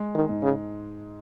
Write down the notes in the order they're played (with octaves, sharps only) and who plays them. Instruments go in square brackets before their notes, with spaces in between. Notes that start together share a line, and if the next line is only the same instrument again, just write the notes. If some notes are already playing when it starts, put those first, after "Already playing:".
Already playing: [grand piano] G#3
[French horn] D#3
[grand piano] G#2
[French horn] C#3